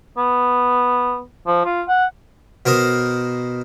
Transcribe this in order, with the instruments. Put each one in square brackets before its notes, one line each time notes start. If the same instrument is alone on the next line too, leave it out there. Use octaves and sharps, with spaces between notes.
[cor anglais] B3
F3
F4
F#5
[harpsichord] B2 A#4 C5 D#6